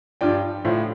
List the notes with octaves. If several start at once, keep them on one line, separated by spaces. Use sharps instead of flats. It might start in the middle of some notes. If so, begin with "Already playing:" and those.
G2 F3 D5 G5
A2 F3 C5 F5